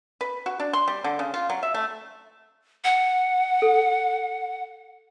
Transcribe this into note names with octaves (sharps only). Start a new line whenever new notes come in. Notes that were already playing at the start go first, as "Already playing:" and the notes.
B4
F#4
D4
C6
G3
D3
C#3
F4
F#3
E5
A3
F#5
A4